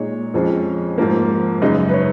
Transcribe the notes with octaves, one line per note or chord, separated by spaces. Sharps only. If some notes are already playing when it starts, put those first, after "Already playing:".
Already playing: A#2 G#3 D#4 C#5
F2 F3 G#3 C#4
G#2 F3 A#3
F#2 C#3 G#3 D#4 D#5
B4
C#5